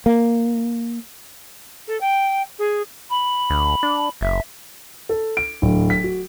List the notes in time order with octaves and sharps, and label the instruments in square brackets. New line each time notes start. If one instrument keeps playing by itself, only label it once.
[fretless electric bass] A#3
[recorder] A4
G5
G#4
[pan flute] B5
[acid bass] D2
D4
[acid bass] F#1 [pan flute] E5
[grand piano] A4
D7
D1
B6
F#4